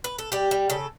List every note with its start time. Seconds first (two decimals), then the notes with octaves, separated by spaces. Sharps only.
0.04 B4
0.18 A4
0.32 G3 G4
0.51 G3
0.70 C#3 A4